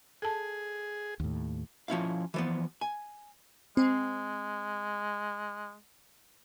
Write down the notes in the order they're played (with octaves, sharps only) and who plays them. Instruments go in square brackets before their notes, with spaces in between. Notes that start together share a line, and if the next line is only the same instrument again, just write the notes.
[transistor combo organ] G#4 [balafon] A4 A5
[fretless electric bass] D#2 A2
[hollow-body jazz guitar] F3 C#4 E4 F5
E3 F3 B3
G#5
[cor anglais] G#3 [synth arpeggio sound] C4